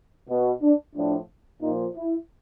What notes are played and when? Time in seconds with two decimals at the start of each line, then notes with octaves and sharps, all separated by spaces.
0.29 B2
0.62 D4
0.96 A2 F3 D4
1.63 A#2 F3 D#4
1.96 E4